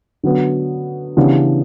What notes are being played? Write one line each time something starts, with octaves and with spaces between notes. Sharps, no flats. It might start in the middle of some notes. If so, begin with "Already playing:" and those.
D3 F#3 B3
C#3 E3 B3 D4 G4